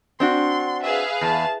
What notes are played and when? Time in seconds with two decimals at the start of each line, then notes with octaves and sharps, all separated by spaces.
0.20 C4 D4 F#4 C6
0.83 G#4 B4 E5 F5
1.21 E2 A5